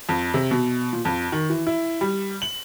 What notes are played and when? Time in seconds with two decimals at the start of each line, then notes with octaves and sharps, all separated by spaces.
0.09 F2
0.34 C3
0.51 B2
0.93 A#2
1.05 F2
1.32 D#3
1.50 E3
1.67 E4
2.01 G3
2.42 F#7